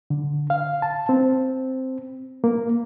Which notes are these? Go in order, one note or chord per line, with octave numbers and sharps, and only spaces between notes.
D3
F5
A5
C4
A#3